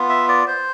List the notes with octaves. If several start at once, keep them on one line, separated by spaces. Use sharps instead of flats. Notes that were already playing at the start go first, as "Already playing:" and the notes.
Already playing: B3 F4
E5
D5
C5